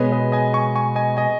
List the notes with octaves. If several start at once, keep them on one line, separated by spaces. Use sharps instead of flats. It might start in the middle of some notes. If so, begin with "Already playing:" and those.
Already playing: B2 G#3 B3 G#4 B4 C#5 D#5
B4 D#5
D#5 G#5
G#5 C#6
G#5 C#6
D#5 G#5
D#5 G#5